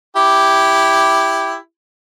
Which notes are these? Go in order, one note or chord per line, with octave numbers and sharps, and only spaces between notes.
E4 G4